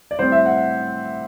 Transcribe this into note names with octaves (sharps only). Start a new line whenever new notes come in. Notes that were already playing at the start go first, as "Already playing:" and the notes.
D5
A2 G3 C4 C5
E5
F#5